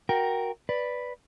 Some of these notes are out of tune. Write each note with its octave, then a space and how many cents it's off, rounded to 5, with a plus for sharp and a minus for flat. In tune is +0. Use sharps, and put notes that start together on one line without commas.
F#4 -5 A#4 +5 G5 +0
B4 +0 D5 +0